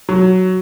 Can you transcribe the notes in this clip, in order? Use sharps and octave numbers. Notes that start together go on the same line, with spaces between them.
F#3